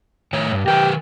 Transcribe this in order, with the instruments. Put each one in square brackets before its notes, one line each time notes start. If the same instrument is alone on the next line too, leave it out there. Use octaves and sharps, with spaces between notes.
[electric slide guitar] A2 D#3 C#5
G2
[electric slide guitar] D#3 A#4 B4 [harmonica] G4